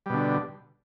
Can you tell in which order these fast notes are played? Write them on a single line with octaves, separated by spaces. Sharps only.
G3 B2 D3